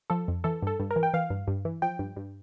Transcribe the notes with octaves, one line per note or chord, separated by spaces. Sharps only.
F3 A4
F2
E3 A4
G2 A4
G2
A#4
E3
G5
E3 F5
G2
G2
E3
F3 G5
G2
G2